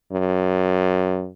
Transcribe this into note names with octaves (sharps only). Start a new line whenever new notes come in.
F#2